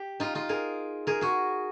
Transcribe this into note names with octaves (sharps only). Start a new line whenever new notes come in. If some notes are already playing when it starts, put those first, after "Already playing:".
Already playing: G4
D#4 F4
D#4 F4
G#4 A#4
G#4 A#4
F#4 G#4